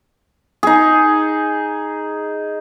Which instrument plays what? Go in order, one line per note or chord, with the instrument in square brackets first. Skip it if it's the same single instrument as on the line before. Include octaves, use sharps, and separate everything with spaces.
[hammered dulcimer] D#4 G#4